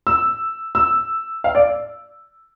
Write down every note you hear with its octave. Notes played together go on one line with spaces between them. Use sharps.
E6
E6
F5
D5